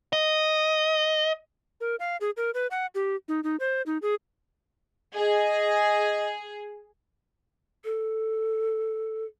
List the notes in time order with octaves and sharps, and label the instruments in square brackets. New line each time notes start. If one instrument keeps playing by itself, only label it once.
[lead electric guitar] D#5
[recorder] A#4
F5
G#4
A#4
B4
F#5
G4
D#4
D#4
C5
D#4
G#4
[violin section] G#4 [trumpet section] D#5
[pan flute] A4